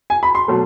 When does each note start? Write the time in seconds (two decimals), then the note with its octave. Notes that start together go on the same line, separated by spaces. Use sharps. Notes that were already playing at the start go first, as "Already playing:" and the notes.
0.10 G#5
0.23 B5
0.35 C6
0.48 B2 F#3 A3